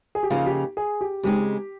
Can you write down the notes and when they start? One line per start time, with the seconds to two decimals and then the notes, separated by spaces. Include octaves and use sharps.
0.15 G#4
0.23 G4
0.30 C#3 F3 A#3 D#4 F4
0.46 G4
0.77 G#4
1.01 G4
1.23 C#3 G#3 C4 D#4 G4